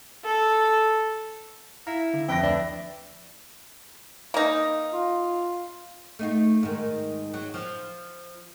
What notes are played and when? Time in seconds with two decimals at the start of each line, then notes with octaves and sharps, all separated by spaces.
0.25 A4
1.87 E4 F5 A#5
2.14 D3
2.28 F2 B4 E5 G5 A#6
2.43 D2 D4 D5
4.34 A#3 D#4
4.93 F4
6.19 A3 D#4 F4
6.63 G#2 D#3
7.34 F#3
7.54 F3